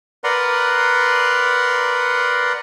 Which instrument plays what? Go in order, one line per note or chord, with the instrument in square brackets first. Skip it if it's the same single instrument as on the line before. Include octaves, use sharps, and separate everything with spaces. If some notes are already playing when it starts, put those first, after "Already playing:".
[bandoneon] A#4 B4 D5 F#5 A#5 C6